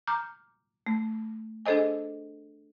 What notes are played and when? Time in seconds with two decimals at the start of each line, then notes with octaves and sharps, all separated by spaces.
0.07 A#5 D6 F6 G6
0.86 A3
1.66 D4 G#4 A4 C5 D#5 G#5